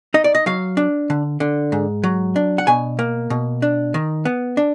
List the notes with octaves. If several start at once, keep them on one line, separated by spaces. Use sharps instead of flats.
D#4 D#5
D5
D#5
F#3 F5
D4
D3
D3
G#2
F#3
D4
F#5
B2 G#5
A#3
B2
D4
D#3
B3
D4